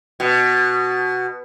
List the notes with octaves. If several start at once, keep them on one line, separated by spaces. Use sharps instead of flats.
B2